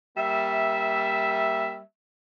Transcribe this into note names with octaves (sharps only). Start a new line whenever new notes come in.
G3 A#3 E5